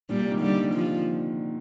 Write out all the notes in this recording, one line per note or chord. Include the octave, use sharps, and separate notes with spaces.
A#2 G3
C3
D#3
D3 G3
F3